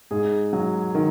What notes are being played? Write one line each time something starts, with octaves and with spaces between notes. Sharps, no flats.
G#2 G#4
F#3
D#3